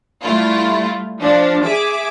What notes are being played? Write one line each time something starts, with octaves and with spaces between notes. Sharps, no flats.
G3 A3 E4 F4
F3 D4
G#4 E5 D6